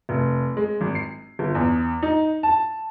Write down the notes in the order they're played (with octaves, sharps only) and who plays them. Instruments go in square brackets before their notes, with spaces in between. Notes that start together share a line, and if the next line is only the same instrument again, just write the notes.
[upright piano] F1
G#3
G#1
C7
G1
E2
D#4
A5